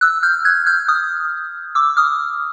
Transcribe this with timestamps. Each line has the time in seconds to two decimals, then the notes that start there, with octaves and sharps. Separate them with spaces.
0.01 E6 F#6
0.23 F6 G6
0.45 F#6 G#6
0.66 F6 G6
0.88 D#6 F6
1.75 D6 E6
1.97 D#6 F6